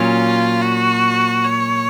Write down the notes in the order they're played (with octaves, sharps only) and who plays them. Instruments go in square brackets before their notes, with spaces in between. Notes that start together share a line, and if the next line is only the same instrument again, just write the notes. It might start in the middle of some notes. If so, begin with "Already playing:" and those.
Already playing: [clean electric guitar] A#2 F#3 C#4 [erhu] F4
[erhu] F#4
C#5